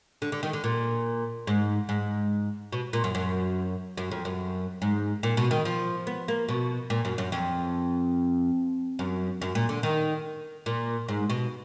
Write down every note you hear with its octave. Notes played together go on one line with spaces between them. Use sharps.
D3
D3
D#3
D3
A#2
G#2
G#2
B2
A#2
F#2
F#2
F#2
F2
F#2
G#2
A#2
B2
D#3
F3
B3
A#3
B2
A#2
F#2
F#2
F2
F#2
F#2
A#2
D3
D#3
A#2
G#2
B2